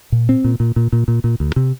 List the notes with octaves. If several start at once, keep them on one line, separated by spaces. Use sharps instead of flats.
A#2
C4
A#2
A#2
A#2
A#2
A#2
A#2
D2
C3